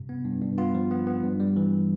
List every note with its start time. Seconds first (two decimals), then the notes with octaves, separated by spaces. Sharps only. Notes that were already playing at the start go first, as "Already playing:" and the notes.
Already playing: G2 C3
0.09 B3
0.25 G2
0.42 G2
0.58 B3 F4
0.75 F3
0.91 B3
1.07 B3
1.23 G2
1.40 G3
1.56 E3